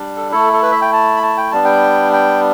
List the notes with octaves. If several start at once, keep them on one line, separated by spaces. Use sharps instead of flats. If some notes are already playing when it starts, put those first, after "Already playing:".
Already playing: G3 D4
A4
A3 E4 A4
A4
B4
E5
G5
A5
B5
A5
G5
G3 B3 D4 A5
G5
G5